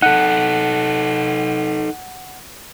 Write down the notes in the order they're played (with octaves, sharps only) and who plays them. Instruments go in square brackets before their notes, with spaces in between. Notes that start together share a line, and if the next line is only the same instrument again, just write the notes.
[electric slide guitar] D#4 A4 [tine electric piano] F#5